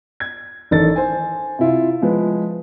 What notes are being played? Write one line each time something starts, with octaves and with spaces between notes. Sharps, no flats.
G#6
A1 D#3 D4 A4 A6
C5 G#5
C3 E4 F4
F3 G#3 B4